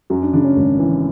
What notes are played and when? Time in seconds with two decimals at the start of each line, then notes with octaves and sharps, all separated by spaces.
0.10 F#2 F#4
0.22 D4
0.33 C#3 D4
0.44 C#4
0.56 G#1
0.79 E3